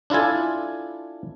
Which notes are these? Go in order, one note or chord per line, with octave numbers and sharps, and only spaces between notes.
D4 E4 F4 A4 G#5